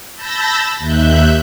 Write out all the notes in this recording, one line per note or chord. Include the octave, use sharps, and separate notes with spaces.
A5 B5 E6 G6 A6 A#6
D#2 E5 F#6 G6